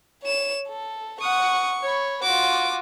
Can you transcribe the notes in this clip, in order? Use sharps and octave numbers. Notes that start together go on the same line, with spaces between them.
C#5 E7
A4
F#5 C#6 D#6
C#5 B5
F4 F#4 D6